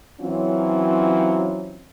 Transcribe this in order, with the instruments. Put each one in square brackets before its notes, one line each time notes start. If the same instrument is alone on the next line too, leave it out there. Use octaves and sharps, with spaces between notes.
[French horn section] E3 F#3 C4 C#4 F4